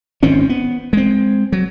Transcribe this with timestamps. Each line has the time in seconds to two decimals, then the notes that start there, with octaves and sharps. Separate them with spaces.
0.23 G#1 D#3 C4 C#4
0.49 B3
0.93 G#3 C4
1.52 F#3